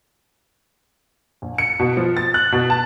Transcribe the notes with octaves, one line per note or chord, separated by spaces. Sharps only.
A#1
C#7
B2
F3
A6
F#6
B2
A5